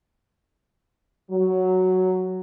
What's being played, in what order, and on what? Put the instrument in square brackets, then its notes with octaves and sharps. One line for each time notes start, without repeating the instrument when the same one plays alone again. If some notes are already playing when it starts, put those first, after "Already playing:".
[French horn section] F#3